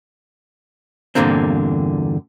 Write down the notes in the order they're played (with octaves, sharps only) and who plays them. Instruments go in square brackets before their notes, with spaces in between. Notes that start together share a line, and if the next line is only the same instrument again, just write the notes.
[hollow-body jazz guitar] E2 G2 A#2 D3 A#3 C4